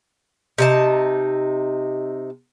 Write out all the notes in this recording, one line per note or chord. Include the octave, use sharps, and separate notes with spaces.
C3 D#4 A5